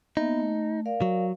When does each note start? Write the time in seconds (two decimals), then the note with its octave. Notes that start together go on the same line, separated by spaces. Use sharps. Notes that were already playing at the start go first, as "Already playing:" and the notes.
0.17 A#3 B3 D#4 E5
0.40 A3
0.86 A#4 D5 F5
1.02 F#3